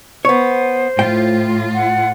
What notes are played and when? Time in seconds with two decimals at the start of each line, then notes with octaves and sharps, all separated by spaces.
0.25 B3 C5 C#5
0.99 A2 F4 G5
1.75 F#5